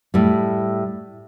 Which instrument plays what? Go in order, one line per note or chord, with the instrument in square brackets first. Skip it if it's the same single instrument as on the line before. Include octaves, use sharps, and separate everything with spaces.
[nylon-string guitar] A2 G3